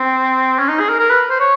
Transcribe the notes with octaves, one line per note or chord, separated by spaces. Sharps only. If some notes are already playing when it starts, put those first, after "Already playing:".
Already playing: C4
C#4
D#4
G#4
A#4
A#4
B4
C5
C#5